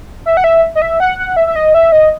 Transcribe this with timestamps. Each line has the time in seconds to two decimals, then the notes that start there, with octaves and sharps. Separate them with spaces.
0.26 E5
0.37 F#5
0.44 E5
0.75 D#5
0.82 E5
1.00 F#5
1.19 F#5
1.37 E5
1.47 E5
1.56 D#5
1.74 E5
1.92 D#5